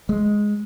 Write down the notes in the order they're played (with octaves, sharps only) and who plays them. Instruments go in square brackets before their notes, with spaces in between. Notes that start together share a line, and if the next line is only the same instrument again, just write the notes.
[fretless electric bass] G#3